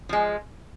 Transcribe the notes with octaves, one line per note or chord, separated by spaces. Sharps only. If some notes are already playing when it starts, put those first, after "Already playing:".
F3 G#3